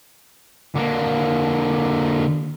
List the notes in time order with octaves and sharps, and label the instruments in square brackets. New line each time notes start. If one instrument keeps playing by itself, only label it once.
[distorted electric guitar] D3 A#3